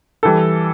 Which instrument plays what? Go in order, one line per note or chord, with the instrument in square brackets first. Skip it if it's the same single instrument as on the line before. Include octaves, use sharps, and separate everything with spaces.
[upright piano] E3 G3 A4